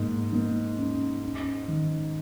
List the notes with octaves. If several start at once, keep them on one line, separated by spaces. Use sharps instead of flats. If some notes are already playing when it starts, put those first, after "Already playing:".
Already playing: G#2 A#3
A#3
C#4
C#4
D#3